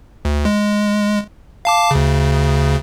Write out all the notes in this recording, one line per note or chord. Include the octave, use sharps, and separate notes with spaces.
D2
G#3
F5 A5 D6
D2 C#3